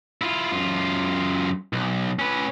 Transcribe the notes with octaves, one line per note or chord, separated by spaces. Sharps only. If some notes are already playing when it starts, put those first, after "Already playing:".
E4 F4
F#2 F4
B1
C#4 B4